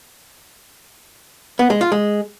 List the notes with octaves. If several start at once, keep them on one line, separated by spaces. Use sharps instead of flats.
B3
G#3
F4
G#3